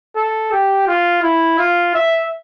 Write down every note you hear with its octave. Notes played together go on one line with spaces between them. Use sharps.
A4
G4
F4
E4
F4
E5